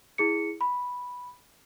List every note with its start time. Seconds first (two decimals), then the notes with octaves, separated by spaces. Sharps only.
0.18 E4 G#4 C#7
0.61 B5